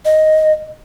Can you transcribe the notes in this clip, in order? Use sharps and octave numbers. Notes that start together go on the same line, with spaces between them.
D#5